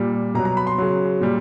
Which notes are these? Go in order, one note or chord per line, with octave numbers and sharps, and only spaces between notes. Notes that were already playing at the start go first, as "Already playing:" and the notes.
Already playing: A#2 G3
B2 F#3 A#5
A#5
B5
C6
C#3 F#3
A#2 G3